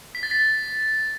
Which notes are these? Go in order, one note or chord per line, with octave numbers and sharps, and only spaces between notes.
B6
A6
B6